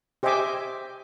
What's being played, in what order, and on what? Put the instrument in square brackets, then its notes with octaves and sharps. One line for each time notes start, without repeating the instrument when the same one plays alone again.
[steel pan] G4 C5 D#5 E5 G#5 D6